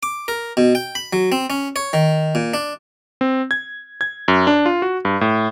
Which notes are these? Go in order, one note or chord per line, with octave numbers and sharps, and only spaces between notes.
D6
A#4
B2
G5
B5
F#3
C4
C#4
C#5
D#3
A#2
D4
C4
G#6
G#6
F#2
D4
F4
F#4
G2
A2